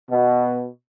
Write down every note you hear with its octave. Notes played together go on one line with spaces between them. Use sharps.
B2